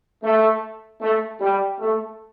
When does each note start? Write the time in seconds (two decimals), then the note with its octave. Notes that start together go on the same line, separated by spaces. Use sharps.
0.23 A3
1.01 A3
1.40 G3
1.79 A3